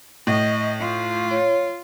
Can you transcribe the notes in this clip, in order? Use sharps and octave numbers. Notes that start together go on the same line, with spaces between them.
A2 D#5
F4
C#5